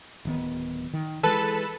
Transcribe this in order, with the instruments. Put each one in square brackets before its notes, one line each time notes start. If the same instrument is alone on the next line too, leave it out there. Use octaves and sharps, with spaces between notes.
[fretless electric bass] D1 D#3 B3
D#3
[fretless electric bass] E3 G#3 [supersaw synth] A4 B4 A5